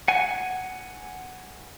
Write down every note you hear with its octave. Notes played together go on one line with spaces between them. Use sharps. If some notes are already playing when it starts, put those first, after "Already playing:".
F#5 G#5